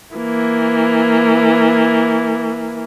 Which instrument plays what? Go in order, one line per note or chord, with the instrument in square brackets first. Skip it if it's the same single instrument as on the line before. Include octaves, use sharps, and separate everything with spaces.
[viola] E3 A#3